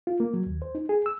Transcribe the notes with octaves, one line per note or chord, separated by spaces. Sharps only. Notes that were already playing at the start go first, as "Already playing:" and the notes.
F4
A#3
F#3
D#2
C5
D#4
G#4
E6